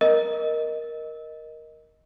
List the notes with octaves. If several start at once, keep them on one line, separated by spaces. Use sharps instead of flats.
A#4 D#5